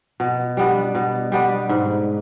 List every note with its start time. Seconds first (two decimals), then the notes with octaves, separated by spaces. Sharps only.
0.20 B2
0.57 G3 B3 D4
0.95 B2
1.32 G3 B3 D4
1.69 G#2